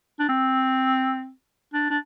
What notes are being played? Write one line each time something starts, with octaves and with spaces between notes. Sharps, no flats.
D4
C4
D4
D4